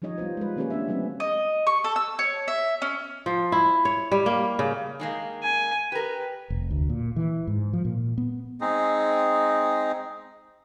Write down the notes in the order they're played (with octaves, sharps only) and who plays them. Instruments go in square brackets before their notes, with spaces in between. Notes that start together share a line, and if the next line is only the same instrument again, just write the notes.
[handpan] F3 G3 D#4 C#5 D#5
G3 B3 F4 C5
G#3 B4
D#3 A#3 C#4 G4 B4 C#5
B3 C#4 D4 E5
F#3 G3 A3 C4 C#4
[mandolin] D#5
C#6
A4
E6
C#5
E5
C#4
[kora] F3
E4
C#5
G3
A#3
C#3
[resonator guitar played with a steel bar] D#3 G#3 A#3
[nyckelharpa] G#5
[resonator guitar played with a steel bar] G4 A#4 [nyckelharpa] B4
[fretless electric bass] F1
D2
A#2
E3
G#2
F3
A#2
B3
[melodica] G#3 C4 D#4 G#4